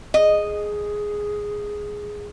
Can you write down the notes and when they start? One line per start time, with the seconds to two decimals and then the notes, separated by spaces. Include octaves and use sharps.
0.14 G#4 D#5